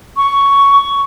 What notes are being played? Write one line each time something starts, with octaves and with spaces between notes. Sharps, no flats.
C#6